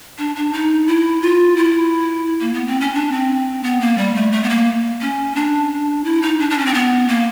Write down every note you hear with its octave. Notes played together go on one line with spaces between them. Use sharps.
D4
D4
D#4
E4
F4
E4
A#3
B3
C4
C#4
D4
C4
B3
A#3
G3
A3
A3
B3
A#3
C#4
D4
E4
D#4
D4
D4
C#4
C4
B3
A#3